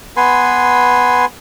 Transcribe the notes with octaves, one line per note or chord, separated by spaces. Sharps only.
B3 B4 G#5 C6